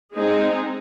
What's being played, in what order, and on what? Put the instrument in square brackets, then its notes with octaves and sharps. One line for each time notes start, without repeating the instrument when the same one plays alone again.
[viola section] G#3 C4 D#4 G#4